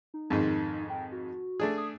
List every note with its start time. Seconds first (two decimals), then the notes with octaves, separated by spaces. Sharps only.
0.14 D#4
0.30 F2 G#2 D#3
0.90 G5
1.12 F#4
1.60 A3 D4 G#4
1.77 D#6